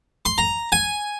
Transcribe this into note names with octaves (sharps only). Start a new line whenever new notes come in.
C6
A#5
G#5